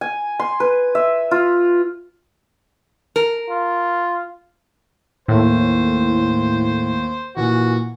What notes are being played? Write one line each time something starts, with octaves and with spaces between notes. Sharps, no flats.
G#5
C6
B4
E5
F4
A#4
F4
D#2 A2 C5
A#2 E3 F#4